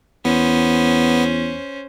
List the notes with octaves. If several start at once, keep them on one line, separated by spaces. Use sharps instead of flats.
E2 B3 C#4 C5